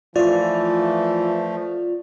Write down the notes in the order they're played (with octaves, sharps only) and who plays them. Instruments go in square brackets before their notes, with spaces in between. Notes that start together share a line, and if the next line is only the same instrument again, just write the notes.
[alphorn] E3 [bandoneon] F3 A3 [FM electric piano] F4 [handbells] D5